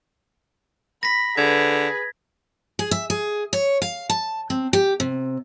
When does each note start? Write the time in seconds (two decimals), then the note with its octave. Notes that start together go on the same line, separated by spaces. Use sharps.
1.03 B5 A#6 B6
1.37 D3 G#4 B4 G#6
2.79 G#4
2.91 E5
3.10 G#4
3.53 C#5
3.82 F5
4.10 A5
4.50 C4
4.73 G4
5.00 C3